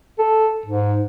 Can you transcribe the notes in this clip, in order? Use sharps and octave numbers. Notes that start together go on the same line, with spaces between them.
A4
G#2